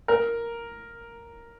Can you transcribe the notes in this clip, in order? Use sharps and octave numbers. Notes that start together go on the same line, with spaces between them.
A#4